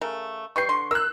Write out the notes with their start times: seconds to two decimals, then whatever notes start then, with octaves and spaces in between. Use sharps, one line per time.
0.01 C#3 A3 A#4
0.56 G3 B4 G5 C#6 C7
0.69 D3 C6
0.91 A#4 E6 F#6